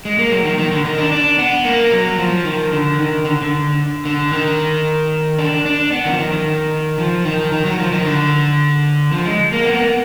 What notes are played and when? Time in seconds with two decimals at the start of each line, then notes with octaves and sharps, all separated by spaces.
0.05 G#3
0.18 A#3
0.32 F#3
0.45 D#3
0.59 D#3
0.71 D3
0.85 D#3
0.98 D4
1.12 D4
1.39 B3
1.65 A#3
1.92 F#3
2.18 F3
2.45 D#3
2.72 D3
2.99 D#3
3.25 D3
3.42 D3
4.05 D3
4.33 D#3
5.39 D4
5.65 D4
5.92 B3
6.05 D#3
6.13 F3
6.19 D#3
6.32 D#3
6.99 F3
7.25 D#3
7.52 D#3
7.65 F#3
7.79 F3
7.92 D#3
8.05 D3
9.12 F3
9.26 G#3
9.52 A#3
9.65 B3
9.73 A#3
9.81 B3